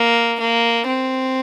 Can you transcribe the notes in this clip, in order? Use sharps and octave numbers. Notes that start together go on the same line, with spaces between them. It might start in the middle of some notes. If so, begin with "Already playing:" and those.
Already playing: A#3
A#3
C4